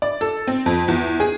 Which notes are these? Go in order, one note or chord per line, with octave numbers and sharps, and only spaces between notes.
D5
A4
C4
F2
E2
G#4